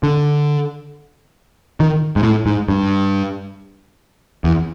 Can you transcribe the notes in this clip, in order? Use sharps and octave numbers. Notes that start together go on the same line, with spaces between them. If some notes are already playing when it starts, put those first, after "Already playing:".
D3
D#3
G#2
A2
G#2
G2
E2